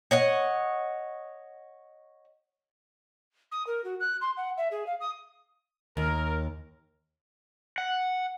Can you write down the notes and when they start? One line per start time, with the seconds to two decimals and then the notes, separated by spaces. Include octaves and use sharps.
0.11 C#5 D#5 F#5
3.52 D#6
3.67 A#4
3.84 F#4
4.00 F#6
4.21 C6
4.37 F#5
4.57 E5
4.71 G#4
4.87 F5
5.00 D#6
5.97 D#2 A#4
7.78 F#5